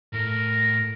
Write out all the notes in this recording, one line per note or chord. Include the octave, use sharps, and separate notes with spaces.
A2 A3 A#4